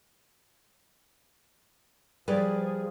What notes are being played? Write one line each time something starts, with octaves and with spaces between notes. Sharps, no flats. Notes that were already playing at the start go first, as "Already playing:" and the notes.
F3 G3 G#4 B4 D5